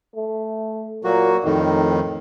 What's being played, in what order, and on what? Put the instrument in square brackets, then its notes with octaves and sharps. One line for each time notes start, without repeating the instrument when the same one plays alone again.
[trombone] A3
[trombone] A#2 [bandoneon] F#3 A#3 F#4
[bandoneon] F2 A2 D#3 [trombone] D#4